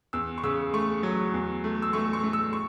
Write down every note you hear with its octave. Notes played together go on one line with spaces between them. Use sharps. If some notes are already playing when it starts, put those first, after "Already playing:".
E2 E6
C#6
C#3 E6
A3 C#6
F#3
E2
A3
E6
A3 C#6
C#6
A3
E6
C#6